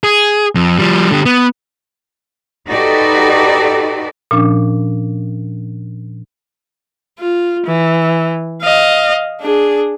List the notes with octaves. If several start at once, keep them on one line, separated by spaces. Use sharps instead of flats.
G#4
F2
F3 G3
D3 G4
B3
D#4 F#4 G4 A4 B4 D5
A#2 F3 C#4 D4
F4
E3
D#5 F5
D4 G#4